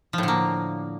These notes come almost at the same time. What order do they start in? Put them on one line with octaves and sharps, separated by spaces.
F3 A2 D3 A#3